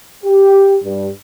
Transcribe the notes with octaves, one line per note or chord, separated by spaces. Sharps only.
G4
G2